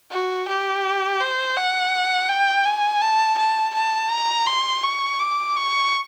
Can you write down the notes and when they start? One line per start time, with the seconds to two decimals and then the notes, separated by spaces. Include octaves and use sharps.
0.11 F#4
0.48 G4
1.21 C5
1.57 F#5
2.29 G5
2.65 G#5
3.01 A5
3.38 A5
3.74 A5
4.10 A#5
4.47 C6
4.83 C#6
5.19 D6
5.56 C#6